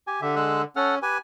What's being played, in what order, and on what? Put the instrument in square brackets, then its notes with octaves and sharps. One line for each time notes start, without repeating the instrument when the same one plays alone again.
[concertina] G4 G#5
[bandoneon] D3 [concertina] G4 E5
[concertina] G#3 E6 F#6
[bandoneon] C#4 [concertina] A4 F#5 F6
[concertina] G4 B4 [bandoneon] G#5